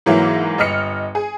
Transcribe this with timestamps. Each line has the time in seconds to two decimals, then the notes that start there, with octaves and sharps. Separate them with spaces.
0.06 G#2 E3 F#3 A#3 E4
0.58 G1 D#5 F6 C#7
1.15 G#4